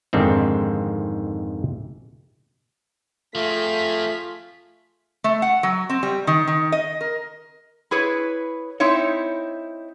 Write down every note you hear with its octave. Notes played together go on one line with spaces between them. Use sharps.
F2 G#2 D3 D#3 C4
F3 A3 C4 F4 G#4 B6
A3
F#5
F#3
C4
G3
D#3
D#3
D#5
A#4
E4 G#4 B4 C#5
C4 D#4 E4 C#5